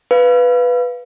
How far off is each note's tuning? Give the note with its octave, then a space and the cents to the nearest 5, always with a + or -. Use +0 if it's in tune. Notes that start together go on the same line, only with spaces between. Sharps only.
B4 +0 F5 +0